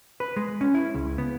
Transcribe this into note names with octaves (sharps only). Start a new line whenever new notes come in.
B4
G#3
C#4
E4
C#2
B3